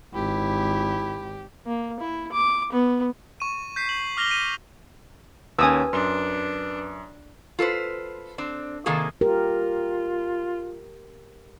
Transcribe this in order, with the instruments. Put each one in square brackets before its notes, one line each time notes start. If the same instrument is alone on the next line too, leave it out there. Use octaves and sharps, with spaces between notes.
[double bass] G#1 [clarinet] E4 [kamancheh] G4
[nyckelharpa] A#3
E4
D6
B3
[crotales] C#6 D#7
G6 B6 C7
F#7
D6 F6 A#6 F7 G7
D#7
[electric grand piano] D#2 C#4 [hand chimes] B4 [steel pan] G#5 D#6 E6
[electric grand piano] F#2 C6 [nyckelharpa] D4
[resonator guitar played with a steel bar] F4 A4 B4 C5
C4 D4
C3 D#3 A#3 G#4 A4
[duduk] F4 [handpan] G4 A#4